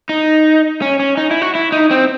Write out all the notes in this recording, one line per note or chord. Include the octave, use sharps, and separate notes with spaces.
D#4
C#4
C#4
D#4
E4
F#4
E4
D#4
C4